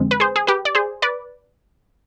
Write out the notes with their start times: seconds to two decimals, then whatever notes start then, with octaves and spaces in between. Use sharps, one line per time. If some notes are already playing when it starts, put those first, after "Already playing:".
Already playing: F2 D3 G#3 C4
0.11 B4
0.20 G#4 C5
0.36 G#4
0.47 G4 B4
0.65 D5
0.75 G#4 C5
1.02 B4 D5